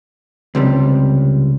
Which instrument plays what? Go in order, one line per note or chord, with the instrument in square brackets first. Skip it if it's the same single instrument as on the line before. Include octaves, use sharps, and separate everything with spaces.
[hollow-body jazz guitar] C#2 C3 G3